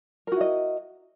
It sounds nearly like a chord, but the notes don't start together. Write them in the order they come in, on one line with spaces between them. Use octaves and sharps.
A#4 F#4 E4 D#5